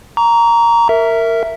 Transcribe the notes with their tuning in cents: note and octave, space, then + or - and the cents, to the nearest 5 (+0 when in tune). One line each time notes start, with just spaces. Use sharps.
A#5 +0 C#6 +45
A#4 -15 E5 +0